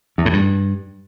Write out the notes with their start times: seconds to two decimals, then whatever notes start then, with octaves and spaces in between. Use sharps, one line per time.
0.18 E2
0.26 A2
0.33 G2